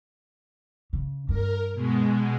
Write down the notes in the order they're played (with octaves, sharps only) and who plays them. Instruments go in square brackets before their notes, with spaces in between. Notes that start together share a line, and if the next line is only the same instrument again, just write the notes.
[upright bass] C#3
[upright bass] G2 [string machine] A#4
[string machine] B2 G#3